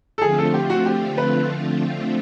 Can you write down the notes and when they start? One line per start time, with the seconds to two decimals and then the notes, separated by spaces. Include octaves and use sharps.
0.18 A4
0.22 D3 F3 A3 C4 F4 G#4
0.38 A4
0.54 G4
0.70 F#4
0.86 G4
1.18 B4